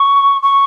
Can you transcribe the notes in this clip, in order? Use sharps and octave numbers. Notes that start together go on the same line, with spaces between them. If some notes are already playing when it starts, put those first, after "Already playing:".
Already playing: C#6
C#6